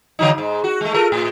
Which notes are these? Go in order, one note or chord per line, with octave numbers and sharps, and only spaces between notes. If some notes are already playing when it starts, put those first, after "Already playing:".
D3 F#3 D#4
G#2
F#4
G#3 A3
F4 A4 A#4
A2